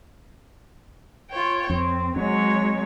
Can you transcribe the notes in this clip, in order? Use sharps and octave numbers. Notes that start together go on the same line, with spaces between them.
F4 C#5 G5
F2 C4
F#3 G#3 C4 C#5